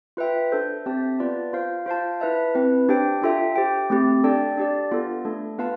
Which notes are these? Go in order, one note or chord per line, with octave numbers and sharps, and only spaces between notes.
F4 B4 E5 G5
D4 A4 C5
C4 G4 C5 E5 A5
B3 F4 B4 D5 A5
F4 C5 F5
F4 C5 F5 A5
E4 B4 E5 A5
C4 E4 B4
D4 G4 C5 G5
D4 F4 A4 E5 G5
G4 C5 G5
A3 C4 G4
D4 A4 D5 G5
D4 G4 D5
B3 F4 A4
A3 D4 A4
B3 F4 B4 F5 A5